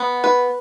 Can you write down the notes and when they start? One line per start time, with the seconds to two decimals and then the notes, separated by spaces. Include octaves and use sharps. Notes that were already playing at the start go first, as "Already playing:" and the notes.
Already playing: B3
0.24 B4